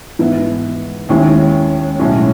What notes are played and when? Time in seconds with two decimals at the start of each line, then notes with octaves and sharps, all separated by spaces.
0.19 G#2 E3 B3 E4
1.09 D#2 D#3 G#3 C#4 E4
1.99 B1 A2 G#3 C#4 E4